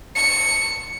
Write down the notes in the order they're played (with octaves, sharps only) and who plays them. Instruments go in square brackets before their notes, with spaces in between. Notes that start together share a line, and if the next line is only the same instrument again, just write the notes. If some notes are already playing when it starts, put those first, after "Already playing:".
[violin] C#7